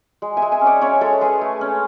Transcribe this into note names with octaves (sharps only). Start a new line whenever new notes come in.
G#3
E5 G#5
G#3
E5 G#5
C#4
D5 F#5
C#4 C#5 E5
G#3 A4 C#5
G#3 G#4 B4
A3
C#4